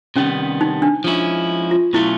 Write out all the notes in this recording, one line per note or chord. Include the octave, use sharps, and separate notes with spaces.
C3 D#3 G3 B3 C#4
D#4
D4
F3 G#3 C#4 E4
F4
B2 F#3 A3 C#4 E4 F4